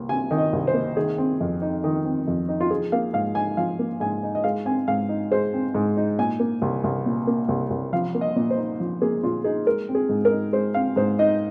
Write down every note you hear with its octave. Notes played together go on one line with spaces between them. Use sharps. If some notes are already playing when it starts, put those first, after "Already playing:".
Already playing: C2 A#3
C3 G#5
D#3
D#5
C2
C5
A#3
D#3 G#4
C4
F2
D#4
D#3
C4
F2
D#4
F4
F3 G#4
A#3 F5
G#2 F5
D#4 G#5
F3 F5
A#3
G#2 G#5
D#4
D#5
G#3 F5
C4 G#5
G#2 F5
D#4
G#3 C5
C4
G#2
D#4
A#2 G#5
A#3
C2
C2
A#2
A#3
C2
C2
F3 F5
A#3
D#5
A#2
C5
D#4
F3
A#3 G#4
A#2 F4
D#4 G#4
G#3 A#4
C4
G#4
G#2
A#4
D#4
G#3 C5
C4 F5
G#2 C5
D#4 D#5